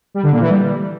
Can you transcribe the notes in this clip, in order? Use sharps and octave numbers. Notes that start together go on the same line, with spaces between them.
G3
D3
A#2
E3
G3